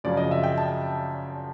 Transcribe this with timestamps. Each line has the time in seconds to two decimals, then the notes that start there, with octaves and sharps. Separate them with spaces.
0.04 F#2 C#3 F3 D5
0.17 D#5
0.31 E5
0.43 G5
0.57 A5